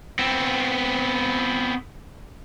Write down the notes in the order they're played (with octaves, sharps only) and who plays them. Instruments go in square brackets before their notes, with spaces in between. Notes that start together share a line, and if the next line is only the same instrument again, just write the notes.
[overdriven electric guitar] B3 C4